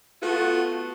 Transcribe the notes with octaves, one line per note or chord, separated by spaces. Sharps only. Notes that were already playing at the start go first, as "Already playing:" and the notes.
A3 B3 F4 F#4